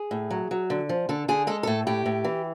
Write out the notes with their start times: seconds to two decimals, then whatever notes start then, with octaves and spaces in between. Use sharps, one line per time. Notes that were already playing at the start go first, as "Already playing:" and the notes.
Already playing: G#4
0.11 A2
0.30 F#3
0.51 F#3
0.70 D3
0.89 F3
1.09 D3 A4
1.28 D3 G#4
1.47 G#3 A4
1.63 A2 A4
1.87 A2 G4
2.06 A2
2.24 E3